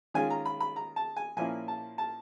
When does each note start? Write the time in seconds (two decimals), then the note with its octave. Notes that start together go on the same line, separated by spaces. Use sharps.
0.14 D#3 G#3 C#4 F4 G#5
0.30 A#5
0.45 B5
0.60 B5
0.76 A#5
0.96 A5
1.17 G#5
1.36 A#2 F3 A#3 C#4 E4 G#5
1.68 A5
1.98 A5